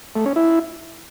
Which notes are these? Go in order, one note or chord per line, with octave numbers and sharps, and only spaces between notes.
A3
C#4
E4